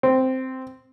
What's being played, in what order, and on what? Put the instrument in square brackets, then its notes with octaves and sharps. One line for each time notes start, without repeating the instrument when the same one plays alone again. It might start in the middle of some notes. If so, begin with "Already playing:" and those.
[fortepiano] C4